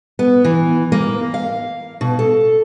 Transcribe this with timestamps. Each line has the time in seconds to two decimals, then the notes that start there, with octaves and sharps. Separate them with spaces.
0.19 B3
0.44 E3
0.92 A#3
1.34 F5
2.01 B2
2.19 A4